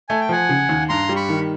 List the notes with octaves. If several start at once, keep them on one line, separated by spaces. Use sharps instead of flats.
A3 G#5
G5
F3 F#5 G#5
C#3
D#2
G2 A#5 C6
G3
B5 C#6
D#3